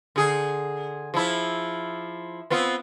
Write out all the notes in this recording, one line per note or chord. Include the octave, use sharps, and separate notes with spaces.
D3 G#4
F3 E4
B3 C4 F4